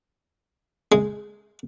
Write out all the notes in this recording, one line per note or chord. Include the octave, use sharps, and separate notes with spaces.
G#3